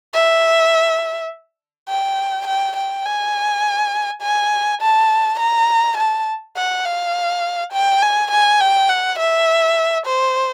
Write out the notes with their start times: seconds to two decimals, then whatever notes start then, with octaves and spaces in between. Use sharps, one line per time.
0.14 E5
1.89 G5
2.47 G5
2.77 G5
3.06 G#5
4.22 G#5
4.82 A5
5.39 A#5
5.98 A5
6.57 F#5
6.85 F5
7.73 G5
8.02 G#5
8.31 G#5
8.61 G5
8.89 F#5
9.19 E5
10.06 C5